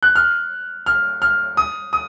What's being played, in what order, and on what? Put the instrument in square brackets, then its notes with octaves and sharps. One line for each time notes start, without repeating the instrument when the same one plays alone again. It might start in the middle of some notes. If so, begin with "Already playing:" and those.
[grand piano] F#6
F6
F6
F6
D#6
D#6